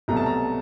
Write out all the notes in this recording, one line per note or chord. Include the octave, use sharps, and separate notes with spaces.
C2 B2 F#3 A3 A#5
A5
A#5